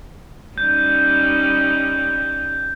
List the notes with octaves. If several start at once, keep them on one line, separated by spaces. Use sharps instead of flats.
G3 C#4 D#4 G6